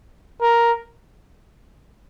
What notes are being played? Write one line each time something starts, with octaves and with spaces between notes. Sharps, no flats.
A#4